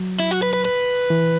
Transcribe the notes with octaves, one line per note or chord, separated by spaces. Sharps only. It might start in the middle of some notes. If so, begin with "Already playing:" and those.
Already playing: F#3
E4
F#4
B4
B4
B4
E3